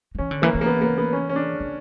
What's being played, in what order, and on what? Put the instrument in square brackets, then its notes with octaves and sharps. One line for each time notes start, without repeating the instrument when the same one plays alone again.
[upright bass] F#3
[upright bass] E3 [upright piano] C#4
[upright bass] D3
[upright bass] E3 [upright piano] A#3
[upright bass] E3
[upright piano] A#3
B3
A#3
B3
C#4
C#4
D4
[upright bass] D3